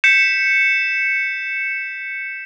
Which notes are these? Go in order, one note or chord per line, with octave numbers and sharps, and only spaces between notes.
G6 B6 C#7 E7